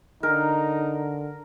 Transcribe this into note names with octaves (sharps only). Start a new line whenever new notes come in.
D3 D#4 A#4